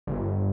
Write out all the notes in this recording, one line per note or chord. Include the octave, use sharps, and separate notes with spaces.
G1